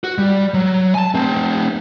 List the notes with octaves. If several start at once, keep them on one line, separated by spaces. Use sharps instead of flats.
F#4
G3
F#3
G#5 A5
A3 C4